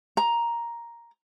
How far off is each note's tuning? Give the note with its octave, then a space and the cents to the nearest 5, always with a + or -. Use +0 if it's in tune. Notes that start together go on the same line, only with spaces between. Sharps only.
A#5 +5